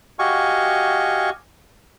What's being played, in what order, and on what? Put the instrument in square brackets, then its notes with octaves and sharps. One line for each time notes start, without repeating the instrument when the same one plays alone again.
[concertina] F#4 G4 D#5 F5 G#5 C#6